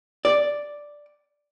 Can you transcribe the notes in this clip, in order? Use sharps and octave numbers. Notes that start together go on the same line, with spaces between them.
D5